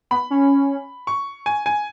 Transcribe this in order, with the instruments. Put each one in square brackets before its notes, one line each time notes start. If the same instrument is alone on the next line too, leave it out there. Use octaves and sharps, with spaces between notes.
[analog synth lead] B3 [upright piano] B5
[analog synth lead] C#4
[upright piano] C#6
G#5
G#5